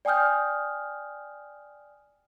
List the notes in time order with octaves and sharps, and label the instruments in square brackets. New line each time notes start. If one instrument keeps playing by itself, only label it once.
[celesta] D5 G5 G#5 D#6 F6 G6